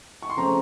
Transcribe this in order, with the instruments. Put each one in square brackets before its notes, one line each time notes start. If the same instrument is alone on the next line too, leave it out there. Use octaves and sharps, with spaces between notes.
[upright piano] C#6
C6
C#3 F3 A3 C4 A#5